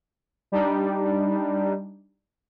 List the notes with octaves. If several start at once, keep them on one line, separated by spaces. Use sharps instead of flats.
G3 D4 D#4